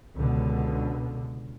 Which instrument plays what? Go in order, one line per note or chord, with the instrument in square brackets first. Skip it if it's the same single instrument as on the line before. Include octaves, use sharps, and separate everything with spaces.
[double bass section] C#2 B2 D3